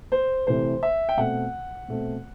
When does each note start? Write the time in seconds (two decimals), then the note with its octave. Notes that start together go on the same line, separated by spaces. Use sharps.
0.12 C5
0.47 C3 E3 A3 C5
0.83 E5
1.09 G5
1.17 B2 A3 C4 F#5
1.88 B2 A3 C4